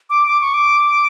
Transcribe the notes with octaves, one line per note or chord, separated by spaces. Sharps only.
D6
D6
C#6
D6